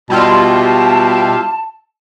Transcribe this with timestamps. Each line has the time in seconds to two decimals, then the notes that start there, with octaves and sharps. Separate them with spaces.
0.10 B2 G3 E4 F4 A5